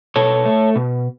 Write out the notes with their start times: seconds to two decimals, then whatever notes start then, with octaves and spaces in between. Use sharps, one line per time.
0.16 B2 A4 C#5
0.45 A3
0.76 B2